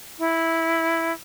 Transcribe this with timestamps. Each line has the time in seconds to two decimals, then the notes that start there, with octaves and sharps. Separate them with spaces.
0.19 E4